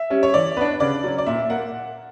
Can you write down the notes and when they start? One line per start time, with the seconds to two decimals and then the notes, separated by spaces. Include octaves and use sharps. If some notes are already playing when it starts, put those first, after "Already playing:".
Already playing: E5
0.10 G3 C#4
0.23 C#5
0.34 E3 D5
0.57 B3 D4 B4
0.80 C#3 D5
1.04 F#3 C#4
1.18 D5
1.26 A#2 E5
1.50 A#3 F#5